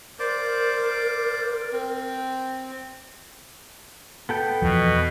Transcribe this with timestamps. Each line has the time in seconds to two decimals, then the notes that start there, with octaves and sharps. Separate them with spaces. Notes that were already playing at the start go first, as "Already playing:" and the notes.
0.19 A#4 C5 D5 D6
1.72 C4
4.29 B3 A4 G5
4.62 E2 B2 F3